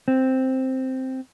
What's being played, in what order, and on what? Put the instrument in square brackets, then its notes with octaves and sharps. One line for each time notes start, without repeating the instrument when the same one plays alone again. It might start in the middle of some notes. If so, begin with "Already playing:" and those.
[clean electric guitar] C4